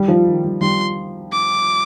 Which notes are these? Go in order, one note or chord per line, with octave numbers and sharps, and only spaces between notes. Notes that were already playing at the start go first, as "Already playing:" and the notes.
Already playing: G3
F3
D#3
G3
G3 C6
D6